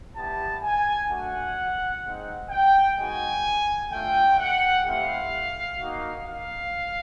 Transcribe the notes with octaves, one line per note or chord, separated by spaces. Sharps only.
G3 B3 E4 G4 A5
G#5
A3 D4 F#4 F#5
G#3 C4 D#4
G5
G#3 B3 D#4 F#4 G#5
A3 D4 F4 G5
F#5
A3 C4 E4 G4 F5
A#3 D#4 F#4
F5